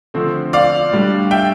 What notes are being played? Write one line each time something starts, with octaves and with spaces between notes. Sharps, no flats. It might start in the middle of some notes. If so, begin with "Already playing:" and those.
D3 F3 A3 C4
D5 F5
A2 G3 D4
E5 G5